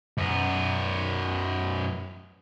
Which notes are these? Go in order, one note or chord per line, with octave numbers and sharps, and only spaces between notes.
F#2 B3